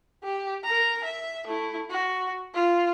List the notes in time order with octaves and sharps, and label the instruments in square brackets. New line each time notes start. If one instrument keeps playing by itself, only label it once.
[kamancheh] G4
A#4 A#5
E5
A3 E4
F#4
F4